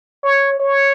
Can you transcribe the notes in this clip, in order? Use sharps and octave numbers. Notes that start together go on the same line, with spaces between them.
C#5
C#5